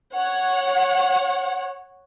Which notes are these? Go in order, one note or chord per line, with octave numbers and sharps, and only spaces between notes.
C#5 F#5